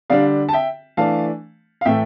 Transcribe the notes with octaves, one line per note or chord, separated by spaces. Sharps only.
D3 G3 D4 D5 F5
A5
E5 G5
E3 A3 D4 F5 A5
F5
A2 E3 A3 E5 G5